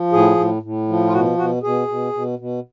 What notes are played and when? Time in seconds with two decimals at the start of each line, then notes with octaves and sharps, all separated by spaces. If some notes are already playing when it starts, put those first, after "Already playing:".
Already playing: F3
0.12 A2 G#4
0.37 A2
0.62 A2
0.88 F3
1.07 F4
1.12 B2 F#4
1.38 B2 F#4
1.63 B2 G#4
1.88 B2
2.13 B2
2.39 B2